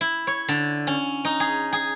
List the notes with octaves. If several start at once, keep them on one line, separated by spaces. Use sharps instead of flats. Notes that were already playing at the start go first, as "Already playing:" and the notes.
E4
C#5
D3
C#4
D#4
G#4
G#4